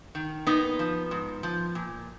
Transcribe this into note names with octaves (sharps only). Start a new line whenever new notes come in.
D#3
A#2 B3 D#4
F3
G#2
F3
A#2